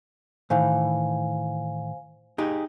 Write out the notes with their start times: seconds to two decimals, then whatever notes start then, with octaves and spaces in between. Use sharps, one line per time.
0.50 A2 D#3 E3 C5 F5 G#5
2.38 D#4 G4 G#4